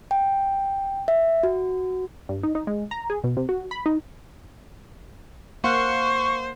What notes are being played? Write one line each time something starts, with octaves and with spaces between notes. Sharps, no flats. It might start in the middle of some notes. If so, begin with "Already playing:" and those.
G5
E5
F#4
G2
D#4
D#4
G#3
A#5
G#4
B2
C3
F#4
B5
D#4
A#3 C5 F5 F#5 C#6